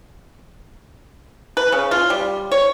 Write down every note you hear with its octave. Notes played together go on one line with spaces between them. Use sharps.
B4
C#3
F4
G3
C#5